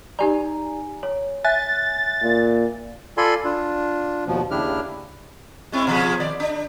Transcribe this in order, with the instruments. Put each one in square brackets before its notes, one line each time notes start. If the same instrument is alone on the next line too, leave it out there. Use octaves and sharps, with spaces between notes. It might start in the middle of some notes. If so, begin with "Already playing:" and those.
[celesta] D#4 G4 D5 [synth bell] G#5 A#5
[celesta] C#5
[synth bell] E5 G#5 F#6 [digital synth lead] A6
[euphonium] A#2
[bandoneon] F4 A4 D5 G#5 B5 C6
D4 F4
D#2 B2 F3
D#2 C#3 D4 E4 G4 F6
[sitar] G#3 C4 E4
B2 F3 G#4
D#3 D5
D4